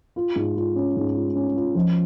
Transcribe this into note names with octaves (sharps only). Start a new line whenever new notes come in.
F4
G#2
F4
C#4
G#2
F4
C#4
F4
F3